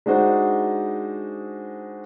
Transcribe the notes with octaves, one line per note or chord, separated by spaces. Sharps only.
G#3 D4 D#4 F#4 C5